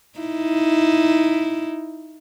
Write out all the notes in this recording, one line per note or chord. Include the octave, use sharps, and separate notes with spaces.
D#4 E4